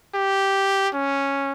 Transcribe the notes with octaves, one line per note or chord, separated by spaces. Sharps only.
G4
C#4